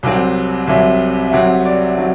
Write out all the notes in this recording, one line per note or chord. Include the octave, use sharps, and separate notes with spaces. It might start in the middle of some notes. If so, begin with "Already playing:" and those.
C2 C3 F#3 C4
C2 C3 F#3 C4 E5
E5
C2 C3 F#3 C4 F#5
D5
F#3 C4